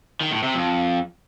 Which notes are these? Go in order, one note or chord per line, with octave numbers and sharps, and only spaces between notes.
D#3
A2
C3
F2